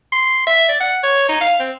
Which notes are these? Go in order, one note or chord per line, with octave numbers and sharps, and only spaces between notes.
C6
E5
D5
F#5
C#5
D#4
F5
C4